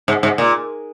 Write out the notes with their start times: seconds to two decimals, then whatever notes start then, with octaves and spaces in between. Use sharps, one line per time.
0.08 G#2
0.23 G#2
0.38 A#2